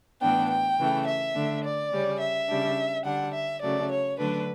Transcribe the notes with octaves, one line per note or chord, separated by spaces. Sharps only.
A2 E3 B3 D4 G5
G5
C#3 E3 A3
E5
D3 A3 D4
D5
C#3 G3 C#4
E5
C#3 G3 D4
D3 G3 D4 F#5
E5
C#3 F#3 A3 D5
C#5
D3 F#3 A3 D4 B4